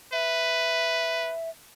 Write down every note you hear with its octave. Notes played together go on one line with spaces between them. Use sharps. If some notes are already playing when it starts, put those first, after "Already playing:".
B4 E5